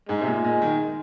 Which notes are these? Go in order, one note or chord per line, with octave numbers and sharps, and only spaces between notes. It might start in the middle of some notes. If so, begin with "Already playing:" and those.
G#2 G#3
C3
A#2
A#2
D#3